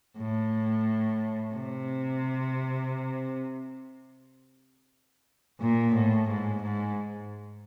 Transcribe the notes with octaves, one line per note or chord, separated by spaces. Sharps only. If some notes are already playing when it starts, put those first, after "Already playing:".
A2
C3
A#2
A2
G#2
G#2